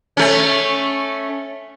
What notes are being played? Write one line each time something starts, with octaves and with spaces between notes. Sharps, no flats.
A3 C#4